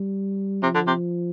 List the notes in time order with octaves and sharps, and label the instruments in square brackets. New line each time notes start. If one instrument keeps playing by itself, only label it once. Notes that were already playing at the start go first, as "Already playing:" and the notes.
Already playing: [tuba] G3
[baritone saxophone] C3 [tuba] F3
[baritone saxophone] D3
C3